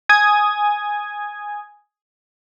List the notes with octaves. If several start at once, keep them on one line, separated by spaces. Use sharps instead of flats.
G#5 D#6 G#6